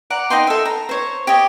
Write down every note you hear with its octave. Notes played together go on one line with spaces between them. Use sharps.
D5 F#5 A#5
D#4 D#5 G5 C6
A4 E5
A#5
C5 C#5
G4 C#5 D#5